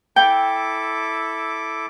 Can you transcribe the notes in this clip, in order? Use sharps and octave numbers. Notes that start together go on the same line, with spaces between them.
E4 A4 G5 D6